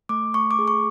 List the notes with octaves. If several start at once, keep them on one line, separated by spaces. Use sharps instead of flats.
A3 D6
A3 C#6
D6
G#4
C#6